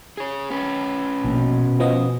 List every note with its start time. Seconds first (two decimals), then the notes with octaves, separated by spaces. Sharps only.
0.17 G#4 C#5
0.51 C#4 B4
1.24 A#1 B2
1.80 F3 B3 D#5